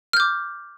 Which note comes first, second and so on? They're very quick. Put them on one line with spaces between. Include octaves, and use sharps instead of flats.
F6 G6 D6